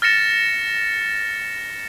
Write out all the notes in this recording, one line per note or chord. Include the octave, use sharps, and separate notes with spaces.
F6 A6 A#6 C#7 E7